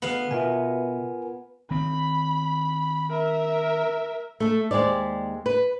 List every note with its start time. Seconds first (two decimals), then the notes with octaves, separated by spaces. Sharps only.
0.02 D2 B3 G#4 F5
0.31 B2 F4 A#4 D#5 E5 G#5
1.71 D#3 C4 B5
3.10 A#4 E5
4.40 A3 A4
4.71 D#2 G#3 G4 C5 D5
5.46 B4